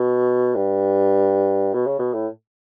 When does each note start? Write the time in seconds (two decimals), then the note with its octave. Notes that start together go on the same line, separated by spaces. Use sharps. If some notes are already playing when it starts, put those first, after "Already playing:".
Already playing: B2
0.55 G2
1.74 B2
1.86 C#3
1.99 B2
2.13 A2